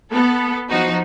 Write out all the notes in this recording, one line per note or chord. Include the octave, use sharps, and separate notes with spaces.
B3 A4
F3 D#4 F#4